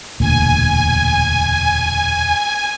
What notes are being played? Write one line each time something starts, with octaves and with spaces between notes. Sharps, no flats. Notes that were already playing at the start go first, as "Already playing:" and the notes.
E1 D2 A#2 G#5